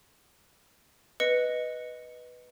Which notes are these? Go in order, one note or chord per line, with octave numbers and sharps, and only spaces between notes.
B4 D#5 C#7